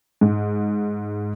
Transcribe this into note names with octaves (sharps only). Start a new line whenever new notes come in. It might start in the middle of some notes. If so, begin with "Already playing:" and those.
G#2